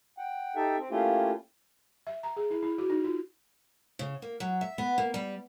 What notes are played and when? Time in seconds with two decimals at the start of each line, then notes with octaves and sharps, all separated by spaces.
0.18 F#5 G5
0.56 D#4 G4 A4 E5 G5
0.78 C4
0.90 A3 A#3 C#4 E4 F4 G4
2.07 E5
2.23 A#5
2.36 G#4
2.51 E4
2.63 E4
2.78 F#4
2.90 D#4
3.04 F4
3.99 C#3
4.22 A#3
4.40 F#3
4.61 E5
4.78 B3
4.98 A#3
5.14 G3